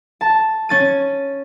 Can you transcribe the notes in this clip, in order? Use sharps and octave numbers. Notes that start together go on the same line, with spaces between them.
A5
C#4 A6 D#7